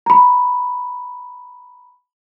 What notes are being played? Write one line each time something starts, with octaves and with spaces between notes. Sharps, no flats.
A#5 B5